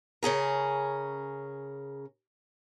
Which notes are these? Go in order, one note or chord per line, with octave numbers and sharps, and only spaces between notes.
C#3 C#4 G#4 A#4